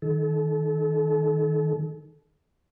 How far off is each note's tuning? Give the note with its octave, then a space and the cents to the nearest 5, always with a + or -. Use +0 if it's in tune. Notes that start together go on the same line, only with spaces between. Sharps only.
D#3 +10 A4 -35